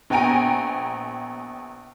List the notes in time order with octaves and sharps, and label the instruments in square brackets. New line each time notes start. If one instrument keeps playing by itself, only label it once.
[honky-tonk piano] A#1 B3 G5 G#5 A#5 D7